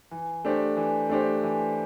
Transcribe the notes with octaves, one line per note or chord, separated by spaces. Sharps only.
E3
A3 D4 G4 C5
E3
A3 D4 G4 C5
E3